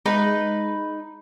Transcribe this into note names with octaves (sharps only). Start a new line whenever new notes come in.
G#3 D#4 B4